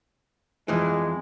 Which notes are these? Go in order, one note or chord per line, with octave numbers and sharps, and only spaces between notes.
F2 E3 G#3